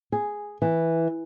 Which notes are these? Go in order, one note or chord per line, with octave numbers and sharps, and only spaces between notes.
G#4
E3